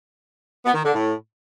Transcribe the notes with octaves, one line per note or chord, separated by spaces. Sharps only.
B3
D#3
D3
A2